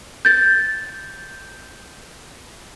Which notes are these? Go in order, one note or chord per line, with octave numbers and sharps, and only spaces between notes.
G6 A6